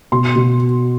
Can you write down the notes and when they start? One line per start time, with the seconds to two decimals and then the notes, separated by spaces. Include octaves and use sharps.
0.12 B2 C6
0.36 B2